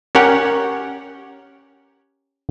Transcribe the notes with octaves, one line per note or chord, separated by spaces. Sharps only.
C#4 G4 A#4 C#5 F#5 G5